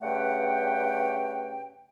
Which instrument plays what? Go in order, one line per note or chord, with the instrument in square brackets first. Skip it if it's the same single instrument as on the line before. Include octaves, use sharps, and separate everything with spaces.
[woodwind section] G2 C#3 A3 B4 F#5 G5